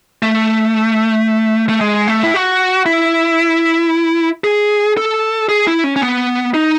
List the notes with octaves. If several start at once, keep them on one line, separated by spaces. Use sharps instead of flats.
A3
A3
G#3
A3
E4
F#4
E4
G#4
A4
G#4
E4
C#4
C#4
B3
D#4